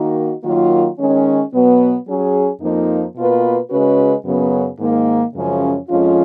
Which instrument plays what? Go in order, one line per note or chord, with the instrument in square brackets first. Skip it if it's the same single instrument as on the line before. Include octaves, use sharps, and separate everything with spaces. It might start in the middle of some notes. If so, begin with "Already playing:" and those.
Already playing: [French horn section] D#3 A#3 D#4 F#4
D#3 F#3 A#3 F4
D#3 G#3 C#4
B2 F#3 B3
F#3 C#4 G#4
F2 F3 A#3 D#4
B2 A#3 F4 B4
C#3 G#3 C#4 F#4 B4
F#2 C#3 F#3 B3
G#2 D#3 A#3
F#2 C#3 F3 G#3 C#4
F2 F3 G#3 C#4 F4